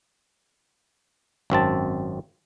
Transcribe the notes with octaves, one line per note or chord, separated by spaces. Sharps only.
G#1 F#2 C4 A5